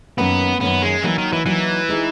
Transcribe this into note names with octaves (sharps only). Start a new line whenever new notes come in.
F#2 D#3 A#3 B3 C#4
F#2 D#3 A#3 B3 C#4
G#3
E3 F#3 A#3 D#4
D#3
E3
E3 F#3 A#3 D#4
G#3 D#4 G#4